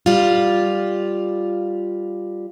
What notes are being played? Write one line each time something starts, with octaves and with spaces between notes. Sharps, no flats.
G3 F4